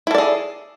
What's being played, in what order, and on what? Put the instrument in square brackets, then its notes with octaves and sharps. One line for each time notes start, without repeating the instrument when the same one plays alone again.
[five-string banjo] E4
A4
D5
G#4